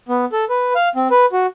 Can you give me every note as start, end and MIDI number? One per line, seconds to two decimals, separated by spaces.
0.09 0.25 59
0.32 0.45 69
0.49 0.73 71
0.75 0.89 77
0.96 1.08 60
1.11 1.26 71
1.32 1.46 66